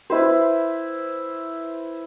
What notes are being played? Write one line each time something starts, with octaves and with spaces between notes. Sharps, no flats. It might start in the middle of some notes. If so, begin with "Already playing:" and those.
E4 B4 C5